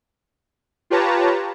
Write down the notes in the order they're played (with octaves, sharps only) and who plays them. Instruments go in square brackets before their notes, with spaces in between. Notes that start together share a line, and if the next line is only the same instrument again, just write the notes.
[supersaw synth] F4 G4 B4 C#5 A5 A#5